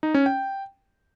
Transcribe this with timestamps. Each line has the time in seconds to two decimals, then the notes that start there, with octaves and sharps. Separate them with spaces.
0.03 D#4
0.14 C#4
0.26 G5